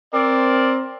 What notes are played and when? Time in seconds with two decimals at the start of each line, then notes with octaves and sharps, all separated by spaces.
0.13 C4 A#4 D5